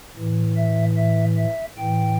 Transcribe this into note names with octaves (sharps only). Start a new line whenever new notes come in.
A2 E3
E5
E5
E5
A2 E3 G5